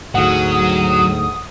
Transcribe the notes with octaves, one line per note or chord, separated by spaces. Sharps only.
D2 G#2 F#3 F#5 D#6